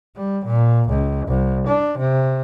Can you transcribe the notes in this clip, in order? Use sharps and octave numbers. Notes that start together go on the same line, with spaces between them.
G3
A#2
C#2
C2
D4
C3